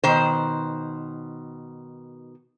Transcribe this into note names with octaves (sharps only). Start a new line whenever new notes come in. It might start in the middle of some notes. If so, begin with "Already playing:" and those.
B2 D#3 C5